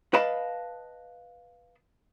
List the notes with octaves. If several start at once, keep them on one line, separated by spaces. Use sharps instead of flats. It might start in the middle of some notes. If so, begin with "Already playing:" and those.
B4 D#5 F5 A5 B5